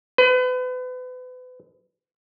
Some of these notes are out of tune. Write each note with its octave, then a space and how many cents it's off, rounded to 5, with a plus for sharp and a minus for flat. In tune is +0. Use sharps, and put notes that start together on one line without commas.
B4 +35